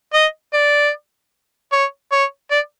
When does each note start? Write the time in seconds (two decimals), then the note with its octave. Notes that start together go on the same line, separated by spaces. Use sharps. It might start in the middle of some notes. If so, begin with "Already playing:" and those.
0.14 D#5
0.53 D5
1.72 C#5
2.12 C#5
2.51 D5